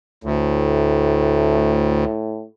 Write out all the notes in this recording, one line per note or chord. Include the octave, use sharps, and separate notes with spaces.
D2 A2